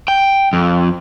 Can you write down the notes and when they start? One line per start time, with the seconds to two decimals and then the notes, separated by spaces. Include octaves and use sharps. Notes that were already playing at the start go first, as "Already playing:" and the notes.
0.08 G5
0.53 F2